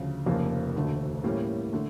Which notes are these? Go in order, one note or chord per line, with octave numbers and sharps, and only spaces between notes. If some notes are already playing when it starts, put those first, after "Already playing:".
Already playing: D2 C#3 F3
F1 F2 C#3 F3 A#3
E1 D2 D3 A3
A2 G3 A#3 C#4
D3 A3